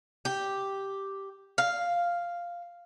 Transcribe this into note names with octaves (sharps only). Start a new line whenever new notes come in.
G4
F5